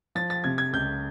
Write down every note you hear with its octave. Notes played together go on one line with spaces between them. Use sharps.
F3 A6
A6
C3 G#6
G#6
C#2 G6